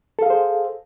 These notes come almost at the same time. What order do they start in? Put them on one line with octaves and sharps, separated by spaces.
A4 F5 G#4 C5